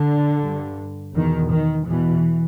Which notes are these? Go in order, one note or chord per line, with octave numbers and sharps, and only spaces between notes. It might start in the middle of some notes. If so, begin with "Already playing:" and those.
Already playing: D3
G2
E2 B2 D#3
D#3
E2 B2 E3